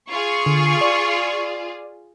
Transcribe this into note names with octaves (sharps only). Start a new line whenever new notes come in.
F4 G#4 C#6
D3
D5